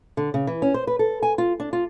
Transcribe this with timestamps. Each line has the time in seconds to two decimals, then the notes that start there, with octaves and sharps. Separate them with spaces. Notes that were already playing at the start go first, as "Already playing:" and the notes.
0.17 D3
0.34 C#3
0.47 E3
0.62 C#4
0.74 C5
0.87 B4
0.99 A4
1.23 G#5
1.38 F4
1.60 D4
1.73 F4